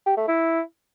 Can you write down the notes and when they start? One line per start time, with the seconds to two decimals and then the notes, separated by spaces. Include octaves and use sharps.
0.06 G4
0.17 A3
0.28 E4